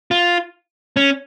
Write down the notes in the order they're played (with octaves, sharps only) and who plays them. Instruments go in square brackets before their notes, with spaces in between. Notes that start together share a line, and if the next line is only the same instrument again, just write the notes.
[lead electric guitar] F4
C#4